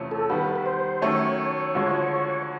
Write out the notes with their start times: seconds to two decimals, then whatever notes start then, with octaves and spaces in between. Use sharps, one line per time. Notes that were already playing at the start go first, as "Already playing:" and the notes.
Already playing: E2 C3 F3 A3 C#4
0.11 A4
0.30 D#3 G3 B3 B4
0.55 B4
0.66 C5
1.02 D#3 F#3 A3 C#4 C#5
1.75 D2 D3 F3 G#3